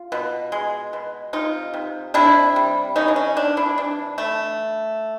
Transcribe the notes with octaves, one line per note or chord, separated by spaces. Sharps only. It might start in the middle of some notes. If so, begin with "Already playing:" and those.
Already playing: F4
B2
G#3
B2
C3 D#4 F4
C3
C3 D4 E4
G3
E3 C#4 D#4
D4
C#4
C3 D4
D4 E4
E3 D4
A3